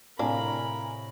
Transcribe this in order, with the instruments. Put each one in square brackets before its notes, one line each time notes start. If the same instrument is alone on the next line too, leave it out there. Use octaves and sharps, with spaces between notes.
[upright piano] A2 C3 [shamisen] D4 [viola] A#4 B5 [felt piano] F5 G#5 A#5